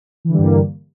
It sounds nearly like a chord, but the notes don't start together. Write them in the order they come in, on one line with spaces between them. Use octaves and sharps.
E3 D3 G3 G2 A#3